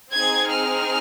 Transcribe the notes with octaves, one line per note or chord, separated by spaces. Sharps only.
C4 D#4 G#4 G#6
F6